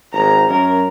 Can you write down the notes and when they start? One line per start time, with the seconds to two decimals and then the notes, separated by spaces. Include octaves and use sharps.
0.13 G#1 A#5
0.49 F#2 A#4